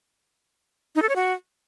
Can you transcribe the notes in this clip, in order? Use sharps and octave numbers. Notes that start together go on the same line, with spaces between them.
D#4
A4
C#5
F#4